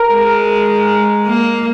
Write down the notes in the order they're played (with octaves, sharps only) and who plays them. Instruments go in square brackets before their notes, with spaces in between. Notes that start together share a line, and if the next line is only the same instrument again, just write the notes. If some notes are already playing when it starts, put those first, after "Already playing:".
Already playing: [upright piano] A#4
[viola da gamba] G#3
A#3